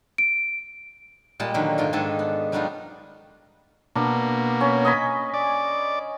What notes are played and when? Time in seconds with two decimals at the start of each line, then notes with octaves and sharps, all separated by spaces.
0.18 D7
1.40 A#2 G3 G#3 A5
1.54 D3 D#3 F3 F#3 A#3
1.78 G#2 A3 F4 G5 A#5 C6
1.93 G#2 D#3 D4 A4 G#5 A5
2.19 B3
2.52 F#3 G3 B3 D4 D#4 F4
3.96 B2 A#3 D4
4.61 C#4
4.85 D#5 G#5 B5
5.34 D5